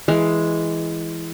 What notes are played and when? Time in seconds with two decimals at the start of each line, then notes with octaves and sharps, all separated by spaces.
0.08 E3 G#3 F5